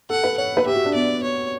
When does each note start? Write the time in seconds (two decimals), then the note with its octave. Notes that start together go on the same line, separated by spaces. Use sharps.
0.10 A4 F#5
0.24 B4
0.37 C#5 F#5
0.57 B4
0.66 G4 E5
0.75 F#4
0.85 D4
0.94 B3 D5
1.23 C#5